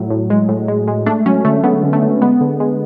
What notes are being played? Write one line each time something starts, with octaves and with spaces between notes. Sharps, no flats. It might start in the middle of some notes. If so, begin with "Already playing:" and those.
Already playing: A2 F#3
A2
G#3
A2
G#3
G#3
A3 D4
F#3 C#4
D3 A3
A3 B3
D3
A3
D3
G#3 B3
D3
G#3